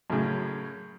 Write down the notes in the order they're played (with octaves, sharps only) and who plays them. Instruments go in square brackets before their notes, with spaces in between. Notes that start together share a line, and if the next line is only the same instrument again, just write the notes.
[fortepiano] F#2 A2 C#3